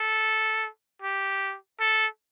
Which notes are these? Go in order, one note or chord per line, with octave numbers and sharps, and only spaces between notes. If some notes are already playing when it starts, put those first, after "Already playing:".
Already playing: A4
G4
A4